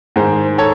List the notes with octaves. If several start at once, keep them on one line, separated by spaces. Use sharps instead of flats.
G#2 D#3 G#3 G#4 C5
A4 C#5